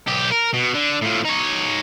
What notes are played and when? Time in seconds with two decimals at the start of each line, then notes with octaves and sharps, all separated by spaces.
0.08 B1 G4
0.32 A#4
0.54 B2
0.74 D3
1.02 A2 F3
1.25 D#4 C#5